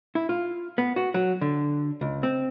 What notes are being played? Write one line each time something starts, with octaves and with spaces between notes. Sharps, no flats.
E4
F4
B3
F#4
F#3
D3
C#2
C4